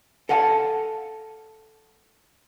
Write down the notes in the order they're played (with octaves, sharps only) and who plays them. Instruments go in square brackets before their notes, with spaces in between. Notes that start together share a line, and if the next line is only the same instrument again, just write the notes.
[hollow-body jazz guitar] A4 F5 F#5 G#5 A5